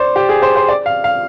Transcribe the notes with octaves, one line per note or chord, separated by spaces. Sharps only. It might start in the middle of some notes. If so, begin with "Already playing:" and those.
Already playing: C5 D5
G4
G#4
C5
C5
D5
F5
F5